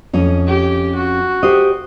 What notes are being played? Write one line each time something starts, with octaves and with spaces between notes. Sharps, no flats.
F2 C#4 D#5
G4
F#4
G4 C5 D#5